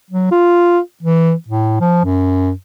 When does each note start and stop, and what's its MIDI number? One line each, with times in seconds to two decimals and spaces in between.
0.11 0.30 54
0.31 0.79 65
1.03 1.33 52
1.48 1.76 45
1.80 2.04 53
2.04 2.52 42